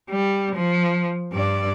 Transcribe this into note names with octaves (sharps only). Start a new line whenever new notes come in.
G3
F3
G2 D5